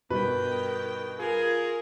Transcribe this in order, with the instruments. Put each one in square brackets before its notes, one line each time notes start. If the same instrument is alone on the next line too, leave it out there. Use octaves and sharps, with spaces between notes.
[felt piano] G2 B2 [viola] D#3 G5 [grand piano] B4
[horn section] F4 G#4 [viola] A#4